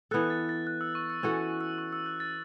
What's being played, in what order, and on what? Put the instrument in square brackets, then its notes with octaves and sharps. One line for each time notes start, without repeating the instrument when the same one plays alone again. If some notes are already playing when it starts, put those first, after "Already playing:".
[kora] E3 B3 A4 [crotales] F#6
[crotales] A6
A6
F#6
E6
C#6
E6
[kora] E3 C#4 F#4 A4 [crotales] C#6
[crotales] E6
C#6
E6
F#6
A6